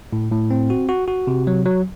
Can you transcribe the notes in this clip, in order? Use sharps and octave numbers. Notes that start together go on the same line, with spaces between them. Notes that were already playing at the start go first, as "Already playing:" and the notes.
A2
A2
C4
F#4
F#4
F#4
C3
F#3
F#3